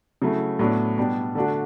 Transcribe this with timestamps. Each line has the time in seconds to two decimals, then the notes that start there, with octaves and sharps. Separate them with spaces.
0.22 C#3 F#3 A3 E4
0.59 A2 F#3 B3 D4
0.97 B2 G3 B3 D4
1.35 D3 A3 D4 F#4